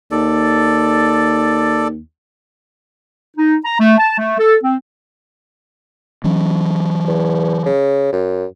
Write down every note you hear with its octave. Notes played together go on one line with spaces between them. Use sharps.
D#2 A4 D5
D#4
A#5
A3
A5
A3
A4
C4
E3 F#3 C#4
E2
C#3
F#2